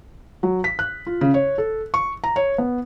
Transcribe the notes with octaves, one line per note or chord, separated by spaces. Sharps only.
F#3
B6
F#6
F4
C#3
C#5
A4
C#6
A#5
C#5
B3